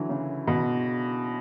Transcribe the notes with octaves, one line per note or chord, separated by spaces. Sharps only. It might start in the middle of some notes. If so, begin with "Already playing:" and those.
Already playing: D3 E3 F#3
C#3
B2